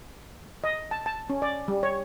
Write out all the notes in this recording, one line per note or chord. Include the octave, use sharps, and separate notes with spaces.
D#5
A5
A5
C#4
D5
G3
C#5